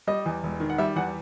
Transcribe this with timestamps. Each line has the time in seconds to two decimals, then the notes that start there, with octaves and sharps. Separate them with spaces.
0.07 G3 D#5
0.26 E2
0.43 E1
0.60 D#3
0.70 F#5
0.78 G3 E5
0.96 E2 F#5